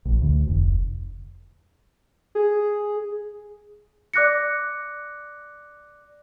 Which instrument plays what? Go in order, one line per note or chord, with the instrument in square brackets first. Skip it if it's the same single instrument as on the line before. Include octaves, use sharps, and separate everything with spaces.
[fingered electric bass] A#1
D2
F1
[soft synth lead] G#4
[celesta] D5 D6 F#6 A#6 C#7